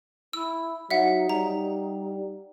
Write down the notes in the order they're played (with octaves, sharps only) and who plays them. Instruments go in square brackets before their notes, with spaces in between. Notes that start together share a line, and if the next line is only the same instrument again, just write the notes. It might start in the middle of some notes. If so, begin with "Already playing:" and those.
[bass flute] E4 [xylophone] E6
[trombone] F#3 [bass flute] D#4 [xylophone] E5 F#5
[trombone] G3 [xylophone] A#5